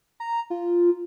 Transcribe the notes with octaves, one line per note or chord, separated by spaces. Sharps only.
A#5
F4